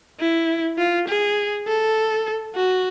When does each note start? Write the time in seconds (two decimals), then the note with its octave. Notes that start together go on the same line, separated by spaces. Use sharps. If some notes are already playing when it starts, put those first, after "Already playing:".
0.20 E4
0.78 F4
1.08 G#4
1.67 A4
2.56 F#4